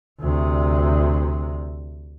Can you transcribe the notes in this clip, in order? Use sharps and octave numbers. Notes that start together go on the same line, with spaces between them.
D2 C3